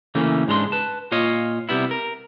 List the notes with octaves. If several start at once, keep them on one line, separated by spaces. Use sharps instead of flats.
C#3 E3 A3 A#3 C#4
G#2 C#3 G#3 D4 A#5 C6
B4 A5
A#2 F4 C#5 D#5
C3 G3 B3 E4
A#4